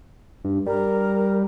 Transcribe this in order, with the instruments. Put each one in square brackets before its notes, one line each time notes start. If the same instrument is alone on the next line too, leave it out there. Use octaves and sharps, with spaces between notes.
[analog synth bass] G2
[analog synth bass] G3 [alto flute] A#4